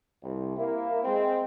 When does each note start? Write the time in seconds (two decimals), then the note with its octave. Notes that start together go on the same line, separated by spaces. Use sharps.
0.23 C2
0.57 A#3 E4
1.03 G#3 C4